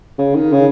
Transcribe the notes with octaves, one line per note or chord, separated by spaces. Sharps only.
C#3
D#3
C#3